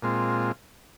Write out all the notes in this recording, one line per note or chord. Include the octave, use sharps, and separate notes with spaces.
A#2 G#3 C4 F4